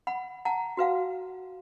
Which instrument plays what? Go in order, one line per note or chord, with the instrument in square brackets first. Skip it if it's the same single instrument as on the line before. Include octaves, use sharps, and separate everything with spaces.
[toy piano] F#5 B5
F#5 A5 A#5
F#4 B4 F5 F#5